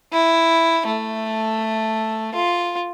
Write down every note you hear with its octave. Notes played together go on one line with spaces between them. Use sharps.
E4
A3
F4